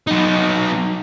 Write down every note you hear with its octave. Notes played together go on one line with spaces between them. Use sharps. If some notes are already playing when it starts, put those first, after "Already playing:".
F#3 D#4